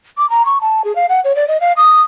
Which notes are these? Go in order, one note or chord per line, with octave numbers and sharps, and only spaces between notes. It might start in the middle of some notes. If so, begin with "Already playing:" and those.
D6
A#5
C#6
A5
G#4
F5
F#5
C#5
D5
D#5
F5
D#6